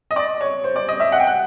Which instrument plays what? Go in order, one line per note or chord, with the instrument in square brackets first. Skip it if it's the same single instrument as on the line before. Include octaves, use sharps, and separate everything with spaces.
[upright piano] D#5
D5
C#5
C5
D5
D#5
E5
F#5
G5
F#5